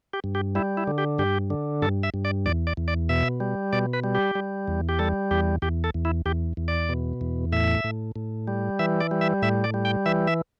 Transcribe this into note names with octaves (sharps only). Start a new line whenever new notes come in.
G4
G2
G4
G3 E4
E4
D3
G4
G2 G4
D3
G2 A4
E5
G2
D5
E2 D5
D5
E2
D5
B2 E5
G3
B2 D5
B4
G3
G4
G3
E2
G4
G3 A4
E2 G4
E2 G4
A4
E2
E4
E2 G4
E2
D5
B2
E2
A2 E5
A2
A2
G3
E3 E5
D5
G3
E5
A2 E5
D5
G3
G5
E3 E5
E5